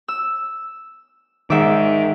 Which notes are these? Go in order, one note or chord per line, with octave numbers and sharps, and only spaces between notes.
E6
G#2 D#3 E5 D6